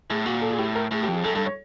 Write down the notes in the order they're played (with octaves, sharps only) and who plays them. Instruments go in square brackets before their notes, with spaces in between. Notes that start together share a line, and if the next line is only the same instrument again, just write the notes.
[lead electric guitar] A2 [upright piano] G#4
[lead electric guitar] A#2 [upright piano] F#4
[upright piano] A4
G#4
[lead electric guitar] A2 [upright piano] G4
[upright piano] A#4
[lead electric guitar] A2 [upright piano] G#4
[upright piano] G4
[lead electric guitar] F2
[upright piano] G#4
[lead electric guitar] F#2 [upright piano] A4
[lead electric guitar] G2 [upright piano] A4
[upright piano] C#5